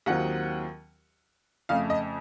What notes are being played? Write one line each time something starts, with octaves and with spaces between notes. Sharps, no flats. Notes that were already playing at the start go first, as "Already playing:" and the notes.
D#2 D#3 F#3 C4 F4 F#5
F2 C#3 A3 F5
D#5